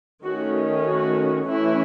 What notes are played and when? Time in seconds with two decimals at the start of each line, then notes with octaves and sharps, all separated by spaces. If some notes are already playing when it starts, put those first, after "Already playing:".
0.24 D#3 A3 C#4 F#4
0.86 F#4
1.49 E3 A3 C#4 E4